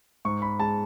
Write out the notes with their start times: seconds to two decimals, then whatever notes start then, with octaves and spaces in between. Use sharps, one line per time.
0.25 G#2 C#6
0.42 B5
0.59 G#3 A5